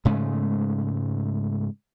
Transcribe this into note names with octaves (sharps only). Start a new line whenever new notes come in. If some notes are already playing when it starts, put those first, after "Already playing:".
G#2 C#3 G#3 A3